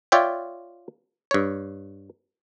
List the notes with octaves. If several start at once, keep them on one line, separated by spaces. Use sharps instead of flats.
F4 C#5 D5 E5 G5
G2 C#5